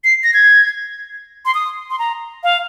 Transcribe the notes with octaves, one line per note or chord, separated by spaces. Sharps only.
C7
A#6
G#6
C6
D#6
C6
A#5
F5